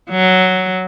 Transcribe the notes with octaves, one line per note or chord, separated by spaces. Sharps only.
F#3